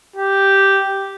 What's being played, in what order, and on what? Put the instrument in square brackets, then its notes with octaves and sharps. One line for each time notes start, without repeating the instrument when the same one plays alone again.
[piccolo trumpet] G4